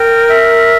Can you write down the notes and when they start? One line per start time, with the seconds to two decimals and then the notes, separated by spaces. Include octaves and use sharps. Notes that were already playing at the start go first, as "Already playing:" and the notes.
Already playing: A#4 G5
0.30 E5